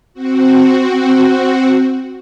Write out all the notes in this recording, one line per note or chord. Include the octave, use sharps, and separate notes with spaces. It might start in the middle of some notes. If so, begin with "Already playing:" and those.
C4 F#4